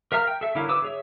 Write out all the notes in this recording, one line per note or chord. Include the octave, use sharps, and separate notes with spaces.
A#4 E5 F5 A#5 F6
G5
A4 E5
D3 F#3 E4 A#4 F5
D3 E4 B4 D6 E6
G#4 C#5 E5